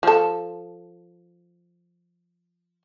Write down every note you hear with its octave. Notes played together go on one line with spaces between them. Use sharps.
F3 A4